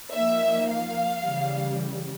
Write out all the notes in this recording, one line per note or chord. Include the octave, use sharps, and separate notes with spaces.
F3 A#3 D#4 E5
F5
C#3 E3 G3